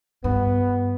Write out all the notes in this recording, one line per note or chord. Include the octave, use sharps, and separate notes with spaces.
G2 B3